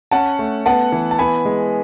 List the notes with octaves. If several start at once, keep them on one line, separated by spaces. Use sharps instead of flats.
C#4 F#5 A5
A3
B3 F#5 A5
E3
A5
B3 G#5 B5
G#3